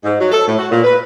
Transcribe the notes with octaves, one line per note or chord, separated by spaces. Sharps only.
G#2
F#3
A4
A2
F#4
A#2
B4